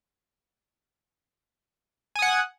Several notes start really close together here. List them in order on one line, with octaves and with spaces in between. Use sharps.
G#5 D#6 F#5